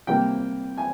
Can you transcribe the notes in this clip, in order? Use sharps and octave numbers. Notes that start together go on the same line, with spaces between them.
C3 G3 A#3 G5
G#5